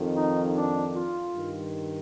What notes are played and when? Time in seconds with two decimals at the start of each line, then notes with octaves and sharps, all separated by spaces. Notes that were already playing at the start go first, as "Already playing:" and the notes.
Already playing: F2 D#3
0.15 D#4
0.55 D4
0.94 F4
1.34 G2 D#3